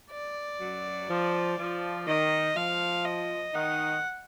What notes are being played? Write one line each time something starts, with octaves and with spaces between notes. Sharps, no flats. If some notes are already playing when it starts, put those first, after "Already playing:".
D5
F#2 F#3
F3
F3
D#3 D#5
F3 F5
D#5
D#3 D#4 F#5